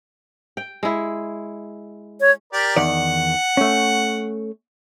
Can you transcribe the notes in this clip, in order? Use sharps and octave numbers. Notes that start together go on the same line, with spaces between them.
G5
G#3 E4
C#5
G4 A#4 D5
E2 D#3 D5 F#5
A3 C#4